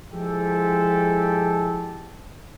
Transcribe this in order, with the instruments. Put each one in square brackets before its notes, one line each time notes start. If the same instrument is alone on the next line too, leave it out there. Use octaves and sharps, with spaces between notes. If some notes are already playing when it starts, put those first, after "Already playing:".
[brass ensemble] F3 G#3 E4 G4 A4